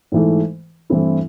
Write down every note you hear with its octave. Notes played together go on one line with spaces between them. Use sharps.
G#2 E3 A3
G2 E3 A3 C4 E4